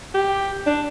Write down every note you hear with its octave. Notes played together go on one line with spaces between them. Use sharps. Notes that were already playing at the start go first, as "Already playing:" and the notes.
G4
D4